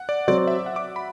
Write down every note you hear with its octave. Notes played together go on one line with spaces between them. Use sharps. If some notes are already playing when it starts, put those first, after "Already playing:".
Already playing: F#5
D5
F#3 C4 F#4 D5
D5
E5
F#5
D6
B5